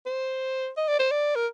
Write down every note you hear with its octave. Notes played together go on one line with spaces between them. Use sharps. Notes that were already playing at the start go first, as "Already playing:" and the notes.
C5
D#5
D5
C5
D5
A#4